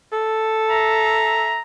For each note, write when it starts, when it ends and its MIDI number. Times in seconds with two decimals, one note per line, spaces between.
0.12 1.58 69
0.70 1.62 76
0.70 1.62 82